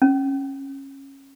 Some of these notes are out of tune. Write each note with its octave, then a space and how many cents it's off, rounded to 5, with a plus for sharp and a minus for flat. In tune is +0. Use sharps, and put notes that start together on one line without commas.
C#4 -20